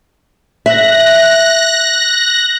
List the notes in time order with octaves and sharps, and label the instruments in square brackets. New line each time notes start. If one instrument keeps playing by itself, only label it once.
[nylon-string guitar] E5 [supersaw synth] F#6 A#6